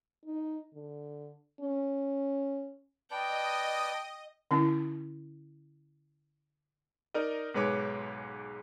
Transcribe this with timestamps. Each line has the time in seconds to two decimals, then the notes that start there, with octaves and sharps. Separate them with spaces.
0.25 D#4
0.74 D3
1.61 C#4
3.11 B4 D5 D#5 G5 A5
4.51 D3 C#4 E4
7.14 D#4 A#4 D5 D#5
7.54 B1 G#2 G#3 B4 C#5 D6